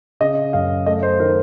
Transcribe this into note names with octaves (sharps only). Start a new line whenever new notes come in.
C#3 D#5
F#2 F5
A3 D#5
C5
D#3 A#4